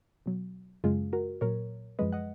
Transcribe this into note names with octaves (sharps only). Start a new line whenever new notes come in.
B2 F#3
F#2 C#3 G#3 F4 G#4
F#4 A#4
A#2 F#3 A#4 C#5
F#2 F3 G#3 B4 D#5
D#5 F#5